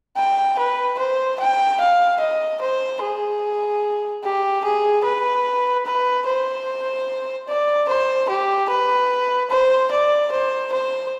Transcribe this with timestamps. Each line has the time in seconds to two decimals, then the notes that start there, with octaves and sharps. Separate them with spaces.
0.17 G5
0.59 B4
0.99 C5
1.40 G5
1.80 F5
2.20 D#5
2.61 C5
3.02 G#4
4.24 G4
4.64 G#4
5.04 B4
5.86 B4
6.27 C5
7.48 D5
7.89 C5
8.29 G4
8.70 B4
9.50 C5
9.91 D5
10.32 C5
10.73 C5